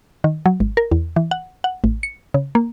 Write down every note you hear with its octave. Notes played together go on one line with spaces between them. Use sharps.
D#3
F#3
G#1
A#4
E2
E3
F#5
F#5
A1
C#7
C#3
A#3